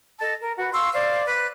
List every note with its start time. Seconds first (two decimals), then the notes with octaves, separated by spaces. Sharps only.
0.20 A4 D#5 A5
0.42 A#4
0.58 F#4 B4
0.73 F5 C6 C#6 E6
0.93 C5 D5 F5
1.26 B4 D6 F#6